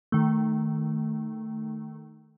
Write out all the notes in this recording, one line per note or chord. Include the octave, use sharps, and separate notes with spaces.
D#3 A3